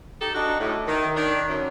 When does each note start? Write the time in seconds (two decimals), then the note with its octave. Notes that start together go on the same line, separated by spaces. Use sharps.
0.21 D#4 G4 A4
0.35 D4 D#4 F#4
0.60 A2
0.88 D#3
1.16 D#3 D4
1.49 F#2